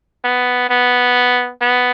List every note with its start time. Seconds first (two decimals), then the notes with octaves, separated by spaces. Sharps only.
0.24 B3
0.70 B3
1.61 B3